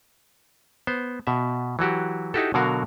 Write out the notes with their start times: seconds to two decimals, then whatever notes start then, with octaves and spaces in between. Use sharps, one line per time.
0.87 B3 C5
1.27 B2 E5
1.79 E3 F#3 F#4 G4
2.34 D#4 E4 F#4 G4 A4
2.54 B2 D3 F#3 F#4 A#4 F5